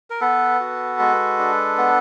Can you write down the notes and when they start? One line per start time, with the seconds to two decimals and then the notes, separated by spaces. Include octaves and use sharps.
0.10 A#4
0.21 B3 A4 B4
0.60 F#4
0.99 G#3
1.39 D4
1.78 B3